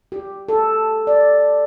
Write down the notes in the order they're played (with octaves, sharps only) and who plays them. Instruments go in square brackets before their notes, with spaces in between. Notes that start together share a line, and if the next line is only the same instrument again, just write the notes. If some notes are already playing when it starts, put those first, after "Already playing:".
[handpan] G4
A4
D5